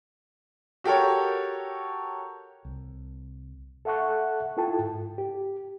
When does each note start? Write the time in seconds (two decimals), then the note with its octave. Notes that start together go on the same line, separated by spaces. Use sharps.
0.84 F#4 G4 A4 A#4 C#5
2.65 C2
3.85 A4 E5 F#5 A5 C#6 F#6
4.57 E4 F4 A4 G5 A5
4.79 G#2
5.18 G4